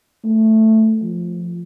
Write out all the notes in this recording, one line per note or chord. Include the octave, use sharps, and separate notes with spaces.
A3
F3